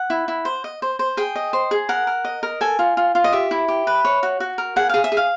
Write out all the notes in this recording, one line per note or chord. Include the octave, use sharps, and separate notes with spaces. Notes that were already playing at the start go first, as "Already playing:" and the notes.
Already playing: F#5
E4
E4
C5
D#5
C5
C5
G#4 G5
D#5
C5
G#4
A#4 F#5
A#4
D#5
A#4
A4 G#5
F4
F4
F4
D#5
G4 E5
E4
G4
B4
C#5
F#4
F#4
A#4
G#4 F#5
G#4 F5
E5
G#4
F5